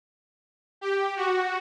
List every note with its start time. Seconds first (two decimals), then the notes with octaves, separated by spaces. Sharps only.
0.81 G4
1.16 F#4